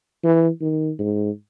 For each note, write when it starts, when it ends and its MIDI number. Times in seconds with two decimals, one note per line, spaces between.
0.24 0.49 52
0.61 0.91 51
0.99 1.30 44